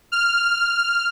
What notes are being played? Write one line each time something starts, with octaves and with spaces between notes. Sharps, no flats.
F6